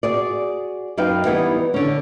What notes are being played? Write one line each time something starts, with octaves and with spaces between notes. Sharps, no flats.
F#4 G#4 D5
F#2 D#4 B4 F5 G5
E3 G3 B3 D#4 E4
D3 C#4